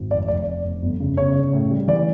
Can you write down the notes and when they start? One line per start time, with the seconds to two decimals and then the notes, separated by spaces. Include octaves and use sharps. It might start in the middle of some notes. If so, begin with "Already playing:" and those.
Already playing: G#1
0.11 F1 D5
0.28 F1 D5
0.46 F1
0.65 F1
0.82 G1
1.00 C#3
1.17 C#3 C#5
1.35 C#3
1.53 A2
1.71 G3
1.88 E3 D5